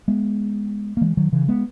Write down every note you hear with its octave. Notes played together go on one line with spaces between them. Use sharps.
G#3 B3
A#3
E3 G#3
D#3 F#3
C#3 E3
G#3 B3